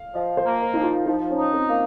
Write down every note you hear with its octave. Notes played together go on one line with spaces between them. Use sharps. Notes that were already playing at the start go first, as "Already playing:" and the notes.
Already playing: F5
F3 D#5
C5
A#3
A#4
F3 D#4
F4
F3 D#4
C#4
D#4
C4
A#3